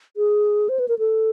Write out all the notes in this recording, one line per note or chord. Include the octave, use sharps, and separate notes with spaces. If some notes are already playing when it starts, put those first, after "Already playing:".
G#4
C5
B4
A#4
A4